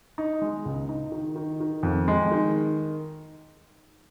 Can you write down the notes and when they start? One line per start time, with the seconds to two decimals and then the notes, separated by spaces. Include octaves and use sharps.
0.18 D#4
0.42 G#3
0.65 C#2
0.89 D#4
1.12 D#3
1.36 D#3
1.60 D#3
1.83 F2
2.08 G#3
2.31 D#3